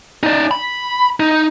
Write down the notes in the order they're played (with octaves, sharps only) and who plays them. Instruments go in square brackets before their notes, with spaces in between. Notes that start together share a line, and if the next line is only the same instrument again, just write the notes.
[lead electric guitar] D#4 D5
B5
D#4